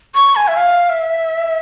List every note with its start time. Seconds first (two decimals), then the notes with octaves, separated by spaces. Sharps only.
0.15 C#6
0.36 G#5
0.48 E5
0.57 F5
0.89 E5